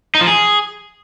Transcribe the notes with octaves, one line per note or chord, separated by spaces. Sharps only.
D#4
F3
G#4